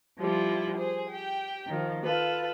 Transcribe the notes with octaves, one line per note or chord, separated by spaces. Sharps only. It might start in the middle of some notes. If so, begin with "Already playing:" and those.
F3 G3 E4 F4
G#4 C5
G4 G5
D#3 F3
F4 A4 B4